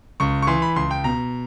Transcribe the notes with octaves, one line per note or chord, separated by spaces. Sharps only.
C#2 C#6
C#6
E3 C6
B5
C#2 C6
G5
B2 A#5